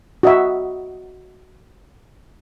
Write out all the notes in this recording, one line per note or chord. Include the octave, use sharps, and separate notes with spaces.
F#4 D#5 E5